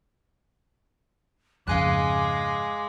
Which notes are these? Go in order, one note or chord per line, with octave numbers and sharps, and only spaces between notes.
F2 G#2 C#3 G#3 F5 G#5 D6 F#6